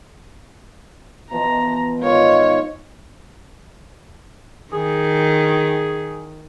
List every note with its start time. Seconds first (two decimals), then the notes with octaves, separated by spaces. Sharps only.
1.31 B2 E3 F3 A#5
2.01 G#2 D#3 F4 C#5 F5
4.73 D#3 G#4